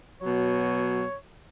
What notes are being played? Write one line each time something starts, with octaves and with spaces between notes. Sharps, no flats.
B2 F#3 C#5